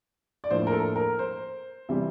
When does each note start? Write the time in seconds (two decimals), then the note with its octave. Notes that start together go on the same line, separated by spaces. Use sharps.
0.44 D5
0.50 A2 F3 A#3 D4 C5
0.67 A#4
0.73 A4
0.96 A#4
1.19 C5
1.89 C3 E3 G3